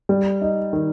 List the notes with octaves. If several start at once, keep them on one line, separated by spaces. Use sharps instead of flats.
G3
D#4
D#3